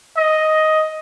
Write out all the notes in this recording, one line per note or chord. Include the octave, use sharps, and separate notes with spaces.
D#5